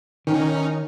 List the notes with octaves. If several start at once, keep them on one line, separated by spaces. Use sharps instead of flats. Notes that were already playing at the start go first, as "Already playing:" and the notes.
D#3 C#4 D#4